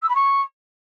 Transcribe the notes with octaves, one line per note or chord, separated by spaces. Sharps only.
E6
B5
C#6